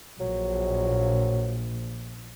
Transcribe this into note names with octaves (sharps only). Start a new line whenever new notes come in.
A#1 F#3